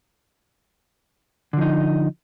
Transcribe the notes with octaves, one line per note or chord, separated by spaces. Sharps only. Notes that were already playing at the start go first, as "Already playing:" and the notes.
D3 F3 D#4